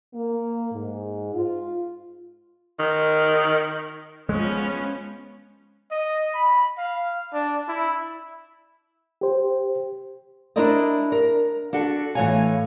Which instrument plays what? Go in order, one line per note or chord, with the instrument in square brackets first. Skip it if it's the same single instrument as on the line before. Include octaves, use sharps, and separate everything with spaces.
[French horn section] A#3
G#2
F4
[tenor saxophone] D#3
[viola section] F3 B3 C#4 [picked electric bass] G#3
[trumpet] D#5
B5
F5
D4
E4
[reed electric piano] G4 C5
[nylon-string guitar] D4 E4 A#4 C5 D5 D#5
A#4
D4 F#4 A4
A2 E3 G#3 C#5 F5 G#5